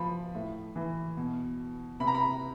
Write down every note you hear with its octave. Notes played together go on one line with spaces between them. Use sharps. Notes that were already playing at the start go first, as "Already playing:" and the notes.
Already playing: F3 B5
A2
E3
B2
C3 B5
A#5
B5